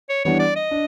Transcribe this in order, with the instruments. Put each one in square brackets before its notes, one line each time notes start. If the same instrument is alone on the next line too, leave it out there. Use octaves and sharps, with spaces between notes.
[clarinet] C#5
[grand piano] E3 G3 B3 D4 [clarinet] C#5
[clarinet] D5
D#5
[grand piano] D4